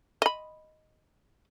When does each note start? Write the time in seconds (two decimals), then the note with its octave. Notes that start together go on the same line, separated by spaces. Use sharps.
0.22 D#5 B5